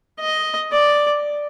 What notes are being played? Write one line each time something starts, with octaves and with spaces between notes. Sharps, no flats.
D#5
D5